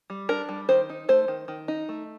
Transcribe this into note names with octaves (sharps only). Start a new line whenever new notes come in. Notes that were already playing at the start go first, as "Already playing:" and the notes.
G3
D4 A#4
G3
D#3 C5
D#4
A3 C5
D#3
D#3
D#4
A3